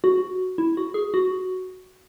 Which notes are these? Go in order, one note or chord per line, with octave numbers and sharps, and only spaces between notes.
F#4
E4
F#4
G#4
F#4